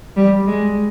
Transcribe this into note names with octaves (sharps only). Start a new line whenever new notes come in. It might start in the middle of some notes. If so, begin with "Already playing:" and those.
G3
G#3